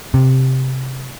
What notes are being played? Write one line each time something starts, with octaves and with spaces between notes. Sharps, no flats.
C3